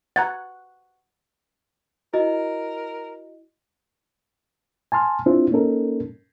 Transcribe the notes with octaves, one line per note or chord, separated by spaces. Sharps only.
F#5 A#5 G#6 A6
E4 F#4 A#4 D#5
G#5 A5 C6 F6
C4 D4 E4 F4 C5
A#3 C#4 D#4 A4 A#4